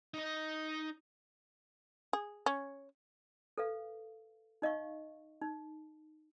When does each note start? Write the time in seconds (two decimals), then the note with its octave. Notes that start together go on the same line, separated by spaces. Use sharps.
0.14 D#4 D#5
2.13 G#4
2.46 C#4
3.58 A4 B4 F5
4.62 D#4 D#5 F5 C#6
5.42 D#4